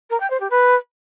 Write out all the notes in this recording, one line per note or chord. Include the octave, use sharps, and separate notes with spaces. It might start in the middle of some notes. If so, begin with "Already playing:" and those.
A#4
G5
C5
G4
B4